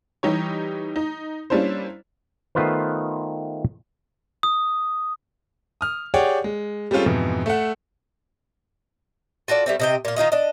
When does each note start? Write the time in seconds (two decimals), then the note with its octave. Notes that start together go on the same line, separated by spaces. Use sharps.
0.23 E3 G3 D#4 G4 C#5
0.96 D#4
1.50 G3 A#3 C#4 D4 E4 C5
2.55 D#3 A3 B3 F4 B4 C5
4.43 D#6
5.81 D#6 F6
6.14 G4 G#4 C#5 D5 F#5 G5
6.44 G#3
6.91 G3 G#3 C4 C#4 F4 A4
7.06 F2 G#2 B2 E3
7.46 A3 A4 E5 F#5
9.48 F4 F#4 A4 D5
9.66 G3 A3 C4
9.80 C3 D#5 G5
10.05 A#2 F4
10.16 D#3 D#4 F4 D#5
10.32 D4 D#5